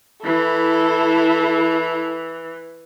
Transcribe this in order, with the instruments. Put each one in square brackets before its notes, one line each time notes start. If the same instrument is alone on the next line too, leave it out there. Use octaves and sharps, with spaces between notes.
[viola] E3 [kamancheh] E4 A4